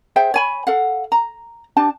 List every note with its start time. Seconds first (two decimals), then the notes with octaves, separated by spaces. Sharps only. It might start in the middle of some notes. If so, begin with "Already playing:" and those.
0.16 G#4 C5 E5 G5
0.34 C#5 G#5 B5
0.67 A4 F5 F#5
1.12 A#5
1.76 D4 G4 A5